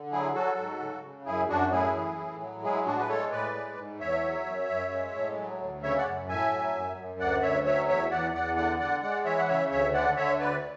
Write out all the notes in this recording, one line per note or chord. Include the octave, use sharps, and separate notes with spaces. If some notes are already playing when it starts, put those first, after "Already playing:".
Already playing: D3
F#3 E4 G#4
F#3 F#4 A4
G#2
C#3
C#3
F#2 E4 G#4
F#2 D4 F#4
A2 E4 G#4
E3
A2
F#3
G#3 E4 G#4
A2 D4 F#4
B4
G#3 A4 C#5
A2 B4 D5
G#3
G#2
E2 C#5 E5
F#3
F#2
F#2
G#3
A2
F#3
D2
C#3 C#5 E5
D5 F#5
F#2
A2 E5 G#5
F#3
F#2
F#2
D2 D5 F#5
D2 C#5 E5
F#3 C#5 E5
E2 C#5 E5
E2 D5 F#5
E2 D5 F#5
D3 D5 F#5
D3 D5 F#5
G#3 D5 F#5
E3 C#5 E5
F#5
C#3 C#5 E5
D2 C#5 E5
D3 D5 F#5
D3 C#5 E5
D2 B4 D5